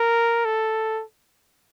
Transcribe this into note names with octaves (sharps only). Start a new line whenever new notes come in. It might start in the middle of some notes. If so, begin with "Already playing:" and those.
Already playing: A#4
A4